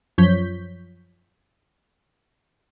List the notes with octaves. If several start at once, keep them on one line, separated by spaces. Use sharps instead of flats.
F#2 F3 C#5 G6 B6